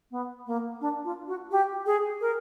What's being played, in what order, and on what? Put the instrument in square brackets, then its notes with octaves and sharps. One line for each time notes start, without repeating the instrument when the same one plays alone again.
[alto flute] B3
A#3
D4
F4
F#4
G4
G#4
A#4